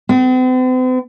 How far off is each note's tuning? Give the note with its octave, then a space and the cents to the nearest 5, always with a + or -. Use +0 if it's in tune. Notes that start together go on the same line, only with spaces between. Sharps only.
C4 -45